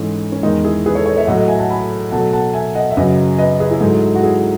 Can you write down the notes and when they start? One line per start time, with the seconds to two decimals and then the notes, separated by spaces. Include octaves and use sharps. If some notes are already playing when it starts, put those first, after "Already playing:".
Already playing: G#2 E3 A3 C#4
0.32 C#4
0.43 E2 D#3 G#3 D#4
0.64 E4 G#4
0.86 G#4 B4
0.95 A4 C#5
1.06 A4 C#5
1.17 C#5 E5
1.27 A2 F#3 A3 D#5 F#5
1.38 D#5 F#5
1.48 E5 G#5
1.59 F#5 A5
1.70 G#5 B5
2.11 B2 F#3 A3 F#5 A5
2.33 F#5 A5
2.54 E5 G#5
2.75 D#5 F#5
2.90 E5
2.97 F#2 C#3 F#3 B4 D#5
3.39 B4 D#5
3.60 G#4 B4
3.71 E4 G#4
3.81 G#2 F#3 A3
4.15 F#4
4.23 E4 G#4